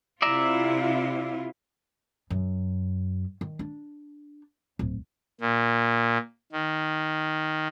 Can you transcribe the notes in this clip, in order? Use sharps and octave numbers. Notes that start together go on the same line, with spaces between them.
C3 E4 F4 D5 E5 A#5
F#2
D#3
D4
D1
A#2
D#3